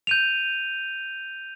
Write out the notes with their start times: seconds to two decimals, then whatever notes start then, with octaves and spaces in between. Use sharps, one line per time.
0.07 G6 D#7 F7